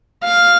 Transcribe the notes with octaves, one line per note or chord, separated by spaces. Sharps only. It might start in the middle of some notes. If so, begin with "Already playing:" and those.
F5